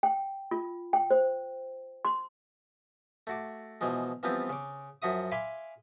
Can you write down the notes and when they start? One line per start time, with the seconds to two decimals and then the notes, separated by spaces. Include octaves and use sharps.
0.03 G5
0.51 F4
0.93 G5
1.11 C5
2.05 C6
3.27 A3 F#4 D6
3.81 B2 E3 F3 G#3
4.23 E3 F3 G3 B3 C4 F4
4.49 C#3 D6
5.02 F#2 F3 F#4 E5 D#6
5.31 E5 F5 G#5 B5 C6 D6